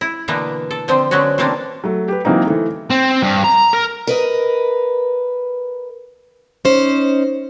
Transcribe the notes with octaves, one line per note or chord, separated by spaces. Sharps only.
E4
B2 D3 E3 A#3 B3
A4
D3 F3 C4
D3 F#3 B3 C#4 F#4
B2 E3 A#3 C4 D4
F#3 A3
G4 B4
E3 F#3 A#3 C4 D#4
E3 A3
C4
G2
A#5
A#4
A#4 B4 D#5
C#4 D#4 C5